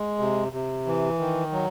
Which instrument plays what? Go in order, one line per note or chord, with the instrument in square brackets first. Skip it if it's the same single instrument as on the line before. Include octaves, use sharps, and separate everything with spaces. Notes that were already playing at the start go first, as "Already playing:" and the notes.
Already playing: [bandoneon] G#3
C3
C3
E3
D#3
F#3